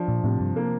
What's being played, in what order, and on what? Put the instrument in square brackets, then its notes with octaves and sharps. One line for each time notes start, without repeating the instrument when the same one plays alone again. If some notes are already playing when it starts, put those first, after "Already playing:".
Already playing: [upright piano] F3 D4
[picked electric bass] A#2
[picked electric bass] A2 [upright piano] C3
[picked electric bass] G2
[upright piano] A#3